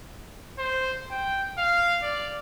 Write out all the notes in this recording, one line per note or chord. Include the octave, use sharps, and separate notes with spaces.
C5
G5
F5
D5